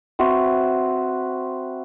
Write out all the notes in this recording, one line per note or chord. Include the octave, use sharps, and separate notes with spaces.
C4 F#4 B4 E5